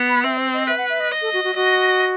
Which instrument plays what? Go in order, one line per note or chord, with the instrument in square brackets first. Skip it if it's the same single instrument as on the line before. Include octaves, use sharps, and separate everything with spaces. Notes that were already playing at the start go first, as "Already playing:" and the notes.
Already playing: [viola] B3
[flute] B5
[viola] C4 [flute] E5
[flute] C5
D#5
[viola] B4 [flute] E5
[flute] F#5
E5
D#5
[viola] D#5
[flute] A4
F#4
F#4
[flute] F#4 [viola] D#5